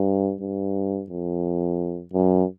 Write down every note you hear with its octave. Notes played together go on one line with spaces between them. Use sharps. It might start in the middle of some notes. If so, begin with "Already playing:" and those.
Already playing: G2
G2
F2
F#2